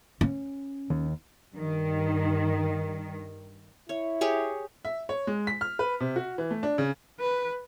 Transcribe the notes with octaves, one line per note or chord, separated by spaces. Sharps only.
C#4
D#2
G2 D#3
E4 C#5
G4 G#4 C#5
E5
C#5
G#3
B6
F6
B4
C3
F#4
E3
A3
D4
C#3
B4